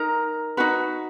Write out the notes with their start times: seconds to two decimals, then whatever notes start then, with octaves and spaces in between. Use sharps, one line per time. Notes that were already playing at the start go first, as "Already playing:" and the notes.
Already playing: D#4 A#4 A#5
0.57 D#4 F#4 B4